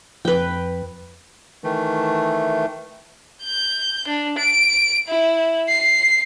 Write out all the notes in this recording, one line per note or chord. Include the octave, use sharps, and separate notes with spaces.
F2 B4 G5
D#3 E3 A3
G6
D4
D7
E4
C7